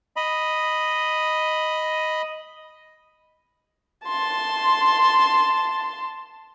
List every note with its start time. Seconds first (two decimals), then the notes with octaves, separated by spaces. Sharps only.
0.16 D#5 B5
4.07 A5 C6